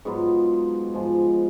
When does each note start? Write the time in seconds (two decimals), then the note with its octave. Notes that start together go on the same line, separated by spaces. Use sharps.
0.05 G#2 F#3 B3 F4
0.94 G#2 F3 G#3